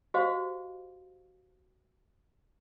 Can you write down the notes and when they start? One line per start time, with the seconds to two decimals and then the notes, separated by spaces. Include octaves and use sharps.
0.14 F#4 G4 C5 D#5 F5